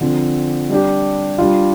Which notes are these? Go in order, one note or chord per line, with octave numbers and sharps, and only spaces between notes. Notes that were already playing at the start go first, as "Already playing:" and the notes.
D3 F3 C4
G3 D4 G4
G3 D4 F4